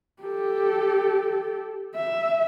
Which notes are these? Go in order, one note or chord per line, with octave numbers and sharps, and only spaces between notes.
G4 A4
E5